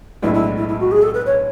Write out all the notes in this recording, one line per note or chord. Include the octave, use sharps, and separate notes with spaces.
B1 A2 G#3 B3 D4 E4
E4
E4
E4
F#4
G#4
A4
B4
C#5